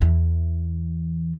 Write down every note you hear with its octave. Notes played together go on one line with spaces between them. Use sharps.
E2 E3